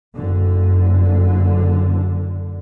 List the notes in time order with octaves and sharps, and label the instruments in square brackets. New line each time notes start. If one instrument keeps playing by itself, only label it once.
[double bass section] F#1 D3